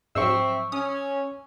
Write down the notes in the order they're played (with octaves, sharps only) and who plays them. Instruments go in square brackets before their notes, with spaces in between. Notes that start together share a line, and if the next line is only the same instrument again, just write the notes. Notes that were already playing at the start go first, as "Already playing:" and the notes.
[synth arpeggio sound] G#2 F3 F#3 [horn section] C4 E5 [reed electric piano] C#6 E6
[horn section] C#4 [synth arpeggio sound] D#6